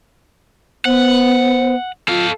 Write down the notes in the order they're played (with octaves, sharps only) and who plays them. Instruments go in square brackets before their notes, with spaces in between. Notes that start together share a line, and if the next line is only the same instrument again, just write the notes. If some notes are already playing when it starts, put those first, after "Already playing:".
[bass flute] B3 [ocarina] C5 [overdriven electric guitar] F#5
[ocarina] F4 [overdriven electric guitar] A4 F5